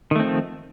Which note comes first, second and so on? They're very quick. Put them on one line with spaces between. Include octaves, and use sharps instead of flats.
D#3 A3 C4 F3